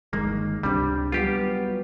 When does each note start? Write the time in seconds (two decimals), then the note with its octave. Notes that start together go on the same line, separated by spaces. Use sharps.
0.13 G1 D#3 G#3 A#3
0.63 C#2 C3 G3 D4
1.12 F#3 G3 B3 F4 G4